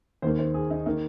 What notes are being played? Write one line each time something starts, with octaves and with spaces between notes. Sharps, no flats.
D#2 D#3 A#3 C5
C5
G#4
D#4
D#3 A#3 D#4